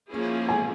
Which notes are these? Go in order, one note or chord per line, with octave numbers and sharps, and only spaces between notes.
F3 A#3 C#4 E4 G#4
G#5